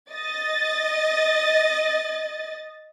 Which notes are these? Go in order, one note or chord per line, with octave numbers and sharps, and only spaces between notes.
D#5 A6